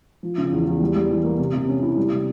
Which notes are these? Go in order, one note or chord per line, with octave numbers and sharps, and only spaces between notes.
F3
C#3
E2
E2
G3
G3
E3
A#3
C3
C3
C#4
E4
G3
C3